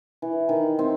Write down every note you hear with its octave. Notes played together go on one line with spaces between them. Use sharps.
E3
D#3
C4